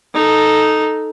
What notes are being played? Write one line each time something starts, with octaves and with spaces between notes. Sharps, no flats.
D#4 A4